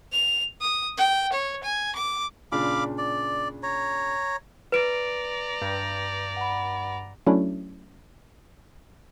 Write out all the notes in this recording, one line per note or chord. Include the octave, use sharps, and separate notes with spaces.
F7
D#6
G5
C#5
G#5
D6
A#2 C#3 D4 F5 B5 D6
D5
C#5 A#5
B4 D5 A#5 D7
G2 G6
F#5 B5
F#3 A3 C#4 D4 E4